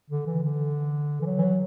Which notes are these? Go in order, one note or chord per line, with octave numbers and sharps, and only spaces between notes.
D3
E3
D3
E3
F#3
E3
F#3